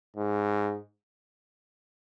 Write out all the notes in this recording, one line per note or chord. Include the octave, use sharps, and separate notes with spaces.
G#2